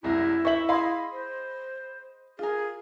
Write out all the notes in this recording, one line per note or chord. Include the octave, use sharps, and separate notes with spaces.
F#1 C2 E4 A#6
C5 E5 C#6 F#7
G#4 D#5 F5 B5 C6
C5
F4 G#4 A#4